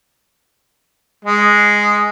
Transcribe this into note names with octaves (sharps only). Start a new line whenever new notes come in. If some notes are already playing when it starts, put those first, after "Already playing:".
G#3